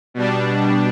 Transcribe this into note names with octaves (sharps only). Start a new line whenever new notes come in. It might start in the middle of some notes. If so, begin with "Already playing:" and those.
B2 G3 D4